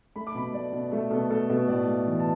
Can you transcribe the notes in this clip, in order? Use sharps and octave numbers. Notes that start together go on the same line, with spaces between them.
A3 B5
D6
B2 B5
A3 D5
B2
A3 A4
B2 A4
A3 A4
B2 A4
A2 D5
A3
E3
A5